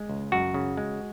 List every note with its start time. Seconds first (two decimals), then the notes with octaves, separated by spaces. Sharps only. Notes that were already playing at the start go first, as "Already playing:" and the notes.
Already playing: G#3
0.09 C#2
0.32 F#2 F#4
0.54 C#3
0.77 G#3